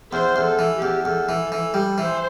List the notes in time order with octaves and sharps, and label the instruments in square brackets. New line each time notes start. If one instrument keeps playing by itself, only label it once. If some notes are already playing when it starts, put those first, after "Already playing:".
[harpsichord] E2 [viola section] C5
[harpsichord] E2
[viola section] A4
[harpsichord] E3
[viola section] G4
[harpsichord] E2
[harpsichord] E2 [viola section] A4
[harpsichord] E3
E3
G3
[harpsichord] E3 [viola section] C5